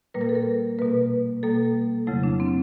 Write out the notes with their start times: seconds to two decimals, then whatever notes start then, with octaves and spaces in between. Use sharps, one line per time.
0.14 A#2 G3 A#3 B4
0.21 A#4
0.29 A4
0.35 A#4
0.78 B2 G3 A#3 B4
1.43 B2 G3 A#3 A4
2.07 F2 C#3 F#3 A3 E4
2.23 D4
2.40 C4